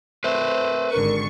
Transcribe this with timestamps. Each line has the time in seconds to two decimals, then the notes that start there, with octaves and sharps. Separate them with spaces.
0.24 A3 C4 B4 C5
0.92 G#1 D3 A#4 C#6